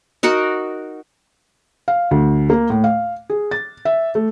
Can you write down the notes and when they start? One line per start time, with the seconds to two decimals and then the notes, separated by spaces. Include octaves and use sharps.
0.23 D#4 F#4 A#4 F#5
1.88 F5
2.11 D2
2.50 A#3
2.70 A2
2.84 F5
3.30 G#4
3.51 A6
3.85 E5
4.15 A3